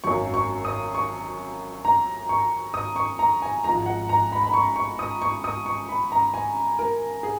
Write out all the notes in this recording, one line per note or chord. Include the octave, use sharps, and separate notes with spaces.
G#1 F#2 D#3 F#3 C#6
C#6
D#6
C#6
A#5
C#6
D#6
C#6
A#5
G#5
G#1 G#2 F3 G#3 A#5
F#5
A#5
B5
B5
C#6
C#6
D#6
C#6
D#6
C#6
B5
A#5
G#5
A#4
G#4